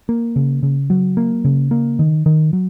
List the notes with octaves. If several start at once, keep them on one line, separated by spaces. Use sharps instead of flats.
A#3
C#3
C#3
F#3
A#3
C#3
A#3
D#3
D#3
F#3